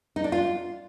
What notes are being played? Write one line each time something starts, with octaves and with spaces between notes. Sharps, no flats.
D#4
D4
F4